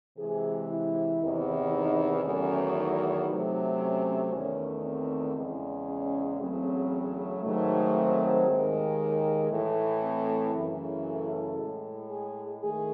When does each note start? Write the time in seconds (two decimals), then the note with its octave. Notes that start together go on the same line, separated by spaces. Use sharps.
0.17 C3 E3 G#3 G#4
0.68 E4
1.21 E2 C3 D#3
1.72 D#4
2.24 E2 D#3 F#3 A3 C#4
2.76 D#4
3.28 C3 F#3 A3
3.80 C#4
4.32 E2 D#3 A3 C#4
4.84 C4
5.36 E2 C#3 G#3
5.87 C#4
6.39 E2 C#3 F#3 A3 C4
7.42 G#2 D#3 F#3 A3
7.94 C4
8.47 D#2 D#3 G#3
9.50 A2 E3 A3
10.02 C4
10.54 F#2 C#3 E3 A3
11.06 A4
11.57 A2 G#3
12.09 G#4
12.61 D#3 A3 G#4